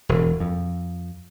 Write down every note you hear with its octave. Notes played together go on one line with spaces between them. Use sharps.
E1
F2